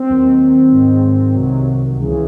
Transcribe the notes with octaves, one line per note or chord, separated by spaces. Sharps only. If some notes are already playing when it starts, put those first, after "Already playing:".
Already playing: C4
D#2 D#3 F#3
G#2 D#3 F#3
C2 C3 D#3 F#3
C#2 C#3 E3